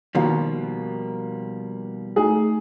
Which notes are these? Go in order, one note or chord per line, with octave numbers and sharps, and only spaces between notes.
B2 D#3 F3 G3 A#3
A3 D#4 G#4